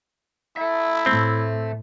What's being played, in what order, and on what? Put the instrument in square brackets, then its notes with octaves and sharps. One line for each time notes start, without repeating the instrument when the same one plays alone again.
[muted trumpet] E4 [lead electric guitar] A4 E5
[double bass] A2 [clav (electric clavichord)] C4